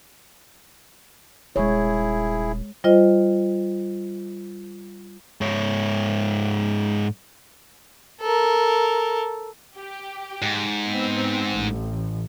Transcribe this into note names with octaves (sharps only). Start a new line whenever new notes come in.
D#1 G#3 E4 G#4 C#5
G3 F4 C5 D#5
G#2 C#5
A4 A#4
G4
G#2
B3 C4
A1